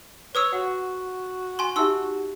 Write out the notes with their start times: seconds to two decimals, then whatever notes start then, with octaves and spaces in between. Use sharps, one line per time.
0.35 B4 C#5 D#6 E6
0.53 F#4 F#5
1.59 G#5 C6
1.76 D#4 G4 E5 C6 E6